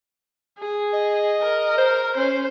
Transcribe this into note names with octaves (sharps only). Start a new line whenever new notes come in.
G#4
D#5
A#4
C5
C#4 C5